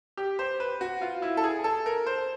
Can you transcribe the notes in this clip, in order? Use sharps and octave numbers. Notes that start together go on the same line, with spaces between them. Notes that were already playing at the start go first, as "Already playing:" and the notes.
G4
C5
B4
F#4
F4
E4
A4
G#4
A4
A#4
C5